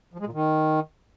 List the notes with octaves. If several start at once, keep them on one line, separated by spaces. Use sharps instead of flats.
F3
G#3
A#2
D#3